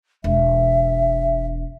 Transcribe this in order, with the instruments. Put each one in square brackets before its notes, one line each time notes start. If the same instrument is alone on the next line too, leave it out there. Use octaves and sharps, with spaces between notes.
[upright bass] E1 [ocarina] E5